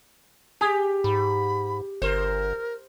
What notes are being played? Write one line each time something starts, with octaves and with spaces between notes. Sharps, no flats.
G4 G#4
G#2 B5
G1 A#4 C5